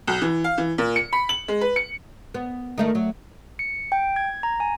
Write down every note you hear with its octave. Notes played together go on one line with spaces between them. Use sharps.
B1
E3
F5
E3
A#2
C#7
B5
F#7
G#3
B4
C#7
B3
D#3 A3 D#4
F#3
C#7
G5
G#6
A#5
G#5